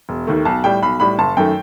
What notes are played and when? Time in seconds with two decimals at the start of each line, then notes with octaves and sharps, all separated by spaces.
0.09 E1
0.27 D#2 D#3 A3
0.45 B1 A5
0.64 A2 G3 G5
0.82 B1 B5
1.00 A2 G3 B5
1.18 F#1 A5
1.37 F#2 D#3 A3 G5